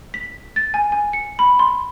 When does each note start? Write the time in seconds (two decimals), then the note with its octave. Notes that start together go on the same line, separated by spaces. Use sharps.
0.14 B6
0.56 A6
0.74 G#5
0.92 G#5
1.13 C#7
1.39 B5
1.59 C6